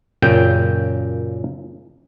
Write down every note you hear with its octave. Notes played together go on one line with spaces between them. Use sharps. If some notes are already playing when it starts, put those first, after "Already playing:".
F#2 A#2 C#3 G5